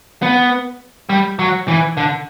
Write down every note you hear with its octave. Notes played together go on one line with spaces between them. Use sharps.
B3
G3
F#3
E3
D3